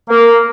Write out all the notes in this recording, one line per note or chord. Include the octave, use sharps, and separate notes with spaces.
A#3